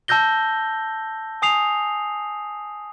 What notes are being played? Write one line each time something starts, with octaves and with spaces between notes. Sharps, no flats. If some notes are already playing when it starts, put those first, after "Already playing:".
A5 E6 G6 A#6 G7
G#5 D#6 C7 F7